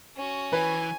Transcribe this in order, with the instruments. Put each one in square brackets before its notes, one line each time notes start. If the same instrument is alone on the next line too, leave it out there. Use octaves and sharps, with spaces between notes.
[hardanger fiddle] C#4 F#4
[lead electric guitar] E3 [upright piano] B4 [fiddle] G#5